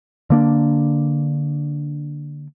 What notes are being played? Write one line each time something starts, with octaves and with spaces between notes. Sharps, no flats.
D3 A#3 D4